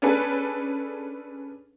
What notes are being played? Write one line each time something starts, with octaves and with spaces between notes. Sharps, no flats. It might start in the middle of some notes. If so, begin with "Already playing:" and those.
C#4 D4 G#4 A4 B4